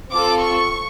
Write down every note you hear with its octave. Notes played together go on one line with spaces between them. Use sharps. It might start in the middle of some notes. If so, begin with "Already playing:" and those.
C4 F4 A4 D6
C#6